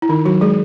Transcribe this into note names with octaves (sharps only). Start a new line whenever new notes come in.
E4
D#3 D#4
F#3 F#4
G#3 G#4